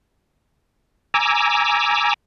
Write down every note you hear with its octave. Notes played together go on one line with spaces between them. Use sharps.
G#5 A#5 D6 E6